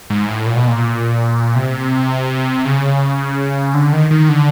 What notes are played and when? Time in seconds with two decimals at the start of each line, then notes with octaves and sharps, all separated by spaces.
0.10 G#2
0.29 A2
0.46 A#2
0.57 B2
0.68 A#2
1.56 C3
2.65 C#3
3.74 D3
3.93 D#3
4.11 D#3
4.29 D3